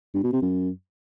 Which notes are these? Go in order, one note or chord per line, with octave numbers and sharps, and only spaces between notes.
G2
B2
C3
F#2